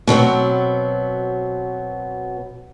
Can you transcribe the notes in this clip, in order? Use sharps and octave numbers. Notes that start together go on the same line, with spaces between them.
B2 F#3 B3 C4